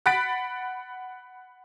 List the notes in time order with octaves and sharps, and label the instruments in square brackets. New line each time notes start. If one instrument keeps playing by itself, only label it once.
[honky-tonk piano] F#5 B5 F#6 A6 B6 D7